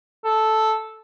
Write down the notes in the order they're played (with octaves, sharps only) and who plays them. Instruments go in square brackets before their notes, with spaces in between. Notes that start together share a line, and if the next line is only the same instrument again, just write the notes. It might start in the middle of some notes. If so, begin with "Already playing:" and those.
[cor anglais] A4